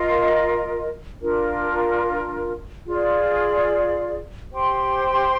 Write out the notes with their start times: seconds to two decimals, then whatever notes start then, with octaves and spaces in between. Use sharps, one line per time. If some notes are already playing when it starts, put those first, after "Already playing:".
Already playing: F4 A#4 D#5
1.21 D4 F4 A#4
2.86 F4 G#4 D5
4.51 G4 C5 G5 C6